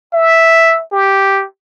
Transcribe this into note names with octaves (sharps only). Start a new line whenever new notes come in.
E5
G4